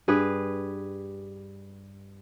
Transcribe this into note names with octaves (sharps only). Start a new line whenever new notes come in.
G2 G4 G#4 B4